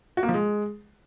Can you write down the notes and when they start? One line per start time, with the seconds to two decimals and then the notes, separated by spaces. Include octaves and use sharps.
0.17 F#4
0.23 A#3
0.29 F3
0.34 G#3